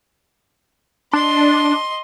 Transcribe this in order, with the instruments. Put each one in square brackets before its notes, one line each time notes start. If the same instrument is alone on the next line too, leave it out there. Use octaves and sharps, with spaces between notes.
[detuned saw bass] D4 [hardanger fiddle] D#5 C6